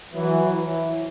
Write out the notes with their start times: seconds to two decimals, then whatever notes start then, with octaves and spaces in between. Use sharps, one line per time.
0.14 E3 F#3
0.54 E3